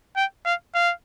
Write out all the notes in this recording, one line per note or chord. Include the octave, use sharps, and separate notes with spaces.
G5
F5
F5